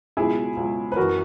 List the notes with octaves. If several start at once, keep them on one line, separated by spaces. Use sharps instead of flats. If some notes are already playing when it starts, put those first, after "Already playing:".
C#2 B2 F#3 E4 G#4
C#2 B2 F#3
B4
F#2 E3 F#4 A#4